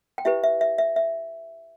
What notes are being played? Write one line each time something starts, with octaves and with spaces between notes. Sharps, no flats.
G5
E4 G4 B4 E5
E5
E5
E5
E5